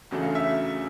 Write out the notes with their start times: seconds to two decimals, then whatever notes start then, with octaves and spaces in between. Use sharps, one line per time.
0.11 E2 C#3 F#3 A3 D4
0.22 F5
0.35 E5